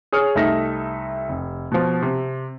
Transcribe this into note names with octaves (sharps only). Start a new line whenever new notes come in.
G#4 C#5 D#6 F6
C2 A3 D#4 E5 A#6
F1
B2 F3
C3